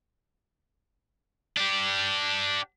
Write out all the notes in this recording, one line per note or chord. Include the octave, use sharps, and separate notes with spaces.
D4 G4